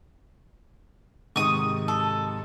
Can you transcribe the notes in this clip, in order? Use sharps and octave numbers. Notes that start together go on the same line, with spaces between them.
G#2 C3 D#3 C#6 D#6
A4